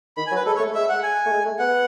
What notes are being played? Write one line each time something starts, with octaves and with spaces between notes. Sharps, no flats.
D#3 B5
G#5
F#3
B4
G#3 A4
C#5
A3
G#3 E5
F#5
G#5
A3
G#3
A3
B3 F#5